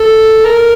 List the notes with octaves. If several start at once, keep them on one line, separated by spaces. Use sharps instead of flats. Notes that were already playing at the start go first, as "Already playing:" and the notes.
Already playing: A4
A#4